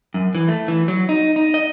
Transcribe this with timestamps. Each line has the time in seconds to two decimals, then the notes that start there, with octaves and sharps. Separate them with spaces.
0.14 F#2
0.35 E3
0.48 A3
0.68 E3
0.88 F#3
1.09 D#4
1.36 D#4
1.54 D#5